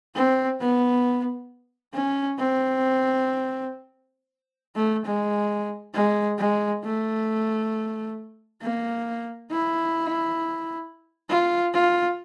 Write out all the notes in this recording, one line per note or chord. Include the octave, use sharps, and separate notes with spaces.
C4
B3
C#4
C4
A3
G#3
G#3
G#3
A3
A#3
E4
F4
F4